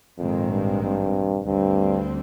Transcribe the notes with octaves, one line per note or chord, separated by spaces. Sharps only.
A#1 F2 G#2 D#3 G#3 C4
G2
G2
D2 G2 D3 G3 C4